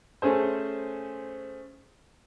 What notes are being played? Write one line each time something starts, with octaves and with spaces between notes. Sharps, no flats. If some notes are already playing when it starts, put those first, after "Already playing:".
A3 C#4 G#4 C5